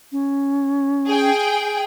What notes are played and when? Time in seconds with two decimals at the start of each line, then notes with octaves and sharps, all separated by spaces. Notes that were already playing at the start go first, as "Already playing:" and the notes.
0.12 C#4
1.07 G#4 G5